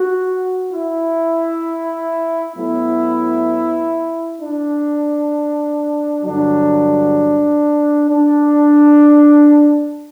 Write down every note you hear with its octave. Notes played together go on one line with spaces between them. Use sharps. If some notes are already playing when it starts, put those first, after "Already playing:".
Already playing: F#4
E4
A2 F#3 B3 E4
D4
G2 D3 F#3 D4
D4